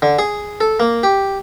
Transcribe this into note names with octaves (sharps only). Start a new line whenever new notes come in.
D3
G#4
A4
A#3
G4